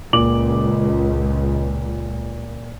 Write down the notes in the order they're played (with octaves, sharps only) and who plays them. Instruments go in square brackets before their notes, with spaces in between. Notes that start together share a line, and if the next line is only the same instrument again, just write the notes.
[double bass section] C#2 [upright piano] A#2 D6 F#7